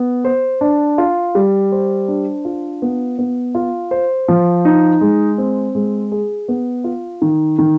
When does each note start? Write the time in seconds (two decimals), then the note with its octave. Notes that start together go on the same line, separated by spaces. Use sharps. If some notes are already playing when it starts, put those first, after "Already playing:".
Already playing: B3
0.25 C5
0.61 D4
0.98 F4
1.35 G3
1.72 C5
2.08 D4
2.45 F4
2.82 B3
3.19 B3
3.55 F4
3.91 C5
4.28 F3
4.65 D#4
5.01 G#3
5.38 C4
5.75 G#3
6.12 G#4
6.48 B3
6.84 F4
7.22 D#3
7.59 D#3